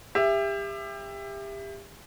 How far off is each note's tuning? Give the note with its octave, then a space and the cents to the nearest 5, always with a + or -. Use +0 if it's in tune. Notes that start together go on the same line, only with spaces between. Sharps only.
G4 +30 E5 +15